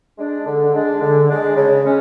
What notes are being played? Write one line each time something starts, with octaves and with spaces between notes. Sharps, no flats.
G#3 D4
D3
G#3 D4
D3
G#3 D4
C#3
G#3 C#4